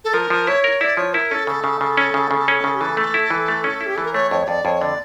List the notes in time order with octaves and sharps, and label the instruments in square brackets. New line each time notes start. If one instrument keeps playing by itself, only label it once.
[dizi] A4
[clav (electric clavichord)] F3 [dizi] A#4
[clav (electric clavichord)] F3
[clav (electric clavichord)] E4 [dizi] C#5
[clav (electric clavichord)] A#4
[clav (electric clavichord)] E4 [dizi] D5
[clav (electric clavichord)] F3 [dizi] C#5
[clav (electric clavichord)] E4 [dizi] A#4
[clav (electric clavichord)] C#4 [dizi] A4
[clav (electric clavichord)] C#3 [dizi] A4
[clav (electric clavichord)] C#3
C#3
C#4
C#3
C#3
C#4
C#3
[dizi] G4
[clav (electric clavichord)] E3 [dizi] A4
[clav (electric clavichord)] A3
E4
E3
A3
C#4
E4
[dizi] G4
[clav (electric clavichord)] E3 [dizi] A4
[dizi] A#4
[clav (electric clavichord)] A3 [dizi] C#5
[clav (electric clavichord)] F2 [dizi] C#5
[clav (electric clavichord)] F2 [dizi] D5
[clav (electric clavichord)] F2 [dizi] C#5
[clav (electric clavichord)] D3 [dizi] D5